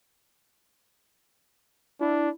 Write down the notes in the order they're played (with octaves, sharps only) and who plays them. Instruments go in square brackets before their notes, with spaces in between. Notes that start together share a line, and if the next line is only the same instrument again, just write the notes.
[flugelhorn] D4 [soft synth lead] E4